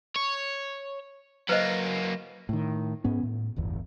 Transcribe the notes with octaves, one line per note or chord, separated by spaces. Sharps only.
C#5
F#2 A#3 B4 C5 D#5
A2 D#3
G#2 B3 C#4
A2
D1 G1 E2